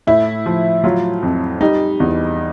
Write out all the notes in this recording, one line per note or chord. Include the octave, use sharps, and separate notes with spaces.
A2 E4
F3
F#3 F4
F2
G3 D#4
E2